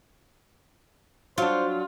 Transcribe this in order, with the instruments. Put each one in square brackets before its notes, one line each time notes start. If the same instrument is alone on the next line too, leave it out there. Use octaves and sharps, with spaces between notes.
[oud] F#3 D4 [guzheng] F4 [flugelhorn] C5